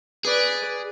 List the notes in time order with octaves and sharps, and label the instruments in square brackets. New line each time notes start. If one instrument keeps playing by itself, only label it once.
[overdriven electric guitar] G#4 [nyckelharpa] B4 D5